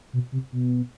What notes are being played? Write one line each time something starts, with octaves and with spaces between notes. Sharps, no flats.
B2
C3
B2